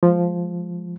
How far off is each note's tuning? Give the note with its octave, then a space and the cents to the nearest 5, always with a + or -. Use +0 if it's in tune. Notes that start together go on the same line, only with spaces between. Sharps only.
F3 +0 G#3 +0